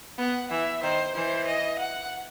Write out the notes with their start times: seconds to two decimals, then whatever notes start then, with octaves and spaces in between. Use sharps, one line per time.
0.18 B3 F#5
0.51 E3 E5
0.83 D#3 C5
1.15 E3 C5
1.47 D#5
1.79 F#5